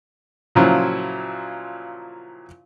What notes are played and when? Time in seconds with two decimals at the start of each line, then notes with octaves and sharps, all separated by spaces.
0.55 A#2 C#3 F3 F#3 E4